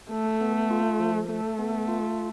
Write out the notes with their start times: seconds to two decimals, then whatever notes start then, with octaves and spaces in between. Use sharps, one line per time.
0.11 A3 A4
0.41 B3
0.71 F4
1.00 F3
1.29 A3 A4
1.59 B3
1.88 F4